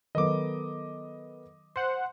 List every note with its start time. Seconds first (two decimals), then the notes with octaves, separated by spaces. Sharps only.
0.15 D#3 F#3 B3 A4 A#4 D#5 D6
1.76 C5 F#5 C6